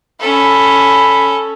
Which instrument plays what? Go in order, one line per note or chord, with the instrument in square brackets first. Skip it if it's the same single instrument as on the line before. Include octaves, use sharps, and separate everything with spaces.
[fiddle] C#4 A4 [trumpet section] B5